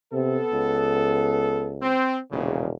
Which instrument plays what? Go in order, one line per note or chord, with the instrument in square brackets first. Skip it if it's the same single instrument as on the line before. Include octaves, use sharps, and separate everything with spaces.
[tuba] C3 [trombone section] B3 A4
[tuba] C#2
[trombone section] C4
[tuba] E1 [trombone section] A#1 A#2 C#3